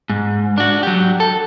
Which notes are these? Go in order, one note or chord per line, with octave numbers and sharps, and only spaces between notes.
G#2
D4 F#4
F#3 G4
A4